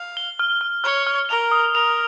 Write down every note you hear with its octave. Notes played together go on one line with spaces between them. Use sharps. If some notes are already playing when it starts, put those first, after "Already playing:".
Already playing: F5
G7
F6
F6
C#5 F6
F6
A#4 F7
D#6
A#4 F7